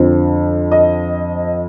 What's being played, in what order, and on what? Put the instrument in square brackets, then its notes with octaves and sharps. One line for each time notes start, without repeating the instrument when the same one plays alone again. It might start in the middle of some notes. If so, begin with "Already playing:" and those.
Already playing: [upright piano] F2 D3 F3 C4
D#5